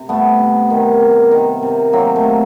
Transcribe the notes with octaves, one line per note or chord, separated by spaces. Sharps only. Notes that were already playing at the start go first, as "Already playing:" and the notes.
Already playing: C3
G3 A3 B3
C3
D#3
C3
D#3
C3
F#3 A#3 C4
A3
C3